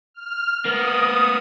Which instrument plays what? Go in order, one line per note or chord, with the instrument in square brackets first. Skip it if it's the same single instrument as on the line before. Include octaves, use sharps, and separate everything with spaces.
[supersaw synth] F6
[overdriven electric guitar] A#3 B3 [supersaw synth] D#6